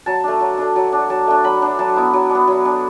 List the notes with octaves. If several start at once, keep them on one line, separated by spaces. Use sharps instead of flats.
F#3 A5
A3 D4
F#3
A3 D4
F#3
D4
F#3 A5
A3 D4
F#3 B5
D4
F#3 A5
B3 E4
F#3
B3 D4
F#3
D4